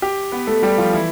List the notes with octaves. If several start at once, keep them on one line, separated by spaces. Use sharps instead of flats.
G4 G5
B3 B4
A3 A4
G3 G4
F3 F4
E3 E4